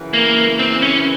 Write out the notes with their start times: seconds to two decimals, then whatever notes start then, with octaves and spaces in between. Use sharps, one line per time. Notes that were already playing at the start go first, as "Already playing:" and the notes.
Already playing: F#2 C#3 E3
0.13 A#3
0.59 C4
0.82 C#4